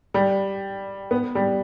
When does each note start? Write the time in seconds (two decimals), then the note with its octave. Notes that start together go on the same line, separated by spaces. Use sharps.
0.14 G3
1.11 B3
1.35 G3